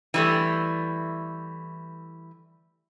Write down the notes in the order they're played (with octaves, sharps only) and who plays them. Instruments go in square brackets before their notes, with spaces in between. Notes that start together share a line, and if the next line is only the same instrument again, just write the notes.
[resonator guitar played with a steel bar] E3 G3 A3